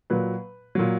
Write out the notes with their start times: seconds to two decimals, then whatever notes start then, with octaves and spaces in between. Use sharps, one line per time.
0.10 A#2 F#3 B4
0.75 A#2 F#3